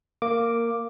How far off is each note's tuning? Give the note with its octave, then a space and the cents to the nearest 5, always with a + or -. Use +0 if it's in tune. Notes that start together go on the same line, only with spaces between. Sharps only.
A#3 -10 D6 +0